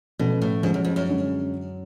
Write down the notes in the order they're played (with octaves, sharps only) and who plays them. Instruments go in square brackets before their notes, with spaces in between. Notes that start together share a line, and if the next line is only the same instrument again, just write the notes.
[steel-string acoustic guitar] B2 [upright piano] F3 A3 C#4
[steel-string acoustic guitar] A2
[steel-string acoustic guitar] G#2 [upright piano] F3 G#3 C#4
[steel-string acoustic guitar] F#2
F2
F#2
[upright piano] D3 G#3 C#4